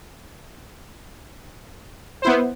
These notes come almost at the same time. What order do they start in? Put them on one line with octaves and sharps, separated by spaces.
C5 E4 B3